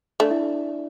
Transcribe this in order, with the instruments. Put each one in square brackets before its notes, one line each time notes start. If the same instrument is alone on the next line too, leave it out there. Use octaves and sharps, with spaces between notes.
[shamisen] A3 [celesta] D4 D5
[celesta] E4 E5